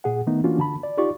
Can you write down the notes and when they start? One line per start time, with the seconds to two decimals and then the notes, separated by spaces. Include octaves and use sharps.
0.04 A#2 G#4 F#5
0.27 D#3 A3 B3 D#4
0.44 E3 A#3 C#4 D4 F4 F#4
0.58 D3 A5 B5
0.83 D5
0.98 D#4 F4 G4 D5 C#6